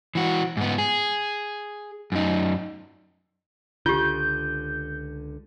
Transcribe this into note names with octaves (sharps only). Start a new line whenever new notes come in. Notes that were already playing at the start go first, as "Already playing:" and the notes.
E3 F#4
G#2 B3
G#4
F#2 D#4
C#2 D3 F4 G4 G6